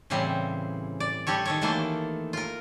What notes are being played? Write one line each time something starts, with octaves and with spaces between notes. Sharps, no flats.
A2 C#3 E3 G3 C4
D5
G3 G4 A4 C#5
D#3 A4 C#5
D#3 E3 A3 A#3 A4 C5
F4 A#4